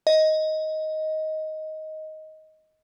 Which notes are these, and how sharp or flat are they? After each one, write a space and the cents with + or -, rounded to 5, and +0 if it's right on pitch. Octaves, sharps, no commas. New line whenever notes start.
D#5 +10